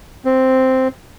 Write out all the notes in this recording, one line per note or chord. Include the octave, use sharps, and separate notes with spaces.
C4